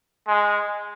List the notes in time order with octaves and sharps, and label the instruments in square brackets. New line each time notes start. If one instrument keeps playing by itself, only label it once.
[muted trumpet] G#3